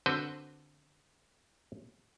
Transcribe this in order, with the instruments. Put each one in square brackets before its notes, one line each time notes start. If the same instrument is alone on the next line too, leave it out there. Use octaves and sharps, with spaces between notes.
[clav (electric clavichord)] D3 C4 F#4 B4 C5